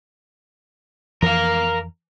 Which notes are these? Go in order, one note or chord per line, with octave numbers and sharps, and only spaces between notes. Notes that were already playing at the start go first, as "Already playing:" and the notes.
F2 E3 F3 A#4 F5